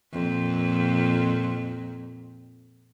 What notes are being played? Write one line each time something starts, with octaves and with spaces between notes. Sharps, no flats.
F2 A#2